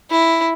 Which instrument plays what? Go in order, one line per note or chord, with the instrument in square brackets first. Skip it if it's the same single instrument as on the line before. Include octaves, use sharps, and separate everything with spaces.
[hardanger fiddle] E4